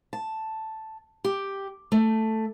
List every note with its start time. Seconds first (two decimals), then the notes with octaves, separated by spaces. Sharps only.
0.13 A5
1.24 G4
1.92 A3